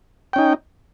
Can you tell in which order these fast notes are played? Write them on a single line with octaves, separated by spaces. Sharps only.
G5 C#4 D#4